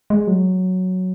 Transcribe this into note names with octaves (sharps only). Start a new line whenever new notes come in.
G#3
F#3